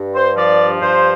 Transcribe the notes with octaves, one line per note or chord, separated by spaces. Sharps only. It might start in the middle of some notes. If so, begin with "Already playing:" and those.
Already playing: G2
C5
F3 D5
G2 C5